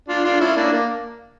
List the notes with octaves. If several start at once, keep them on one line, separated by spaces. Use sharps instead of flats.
D4 F4
D4 F4
C#4 E4
A#3 D4
A#3